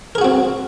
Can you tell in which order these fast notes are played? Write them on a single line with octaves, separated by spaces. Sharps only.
A#4 G#4 F#4 C4